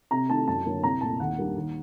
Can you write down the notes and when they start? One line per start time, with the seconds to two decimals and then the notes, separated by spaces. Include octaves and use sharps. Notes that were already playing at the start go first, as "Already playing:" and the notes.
0.11 C3 A#5
0.29 D#3 A3 D#4 A5
0.48 F#2 A5
0.66 D3 F#3 A#3
0.83 C2 A#5
1.01 A#2 A3 A5
1.19 D#2 F#5
1.38 D#3 G3 A#3 D4
1.56 D#2